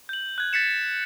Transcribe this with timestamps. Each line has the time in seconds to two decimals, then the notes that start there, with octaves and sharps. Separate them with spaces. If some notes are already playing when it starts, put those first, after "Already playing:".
0.09 G6 F#7
0.38 F#6 G#6
0.53 A6 B6 C#7 E7